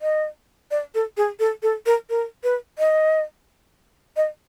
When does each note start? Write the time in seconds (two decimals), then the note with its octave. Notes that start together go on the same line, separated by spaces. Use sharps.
0.02 D#5
0.71 D5
0.95 A4
1.17 G#4
1.40 A4
1.63 A4
1.86 A#4
2.10 A#4
2.44 B4
2.79 D#5
4.17 D#5